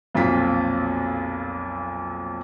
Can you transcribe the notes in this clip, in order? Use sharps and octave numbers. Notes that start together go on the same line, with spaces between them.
B1 F2 A#2 F4 B6